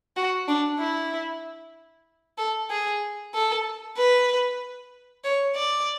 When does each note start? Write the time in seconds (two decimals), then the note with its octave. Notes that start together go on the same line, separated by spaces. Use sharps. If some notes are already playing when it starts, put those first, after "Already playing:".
0.17 F#4
0.48 D4
0.79 E4
2.38 A4
2.70 G#4
3.34 A4
3.98 B4
5.24 C#5
5.56 D5